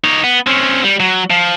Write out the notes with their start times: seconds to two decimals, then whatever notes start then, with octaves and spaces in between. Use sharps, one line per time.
0.04 D#4 C#5
0.24 B3
0.47 C4 C#4
0.84 G3
1.00 F#3
1.31 F3